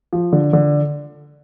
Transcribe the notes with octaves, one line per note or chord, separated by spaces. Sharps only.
F3
D3
D3